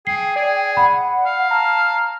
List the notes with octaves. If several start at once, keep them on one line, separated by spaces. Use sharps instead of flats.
G#4 G5 C7
G#4 D5
F#5 B5
F5
A5 A#5 F6